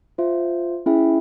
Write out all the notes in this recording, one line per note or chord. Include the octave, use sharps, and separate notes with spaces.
F4 C5 E5
C#4 E4 G#4 E5 G5